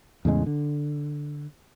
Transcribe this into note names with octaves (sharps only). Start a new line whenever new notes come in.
E2 A2 C#3 G#3
D3